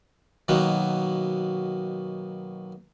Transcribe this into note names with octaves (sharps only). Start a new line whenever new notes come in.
B2 D#3 F#3 A#3 B3